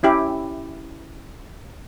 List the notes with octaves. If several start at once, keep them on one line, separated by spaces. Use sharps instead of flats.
C#4 E4 G4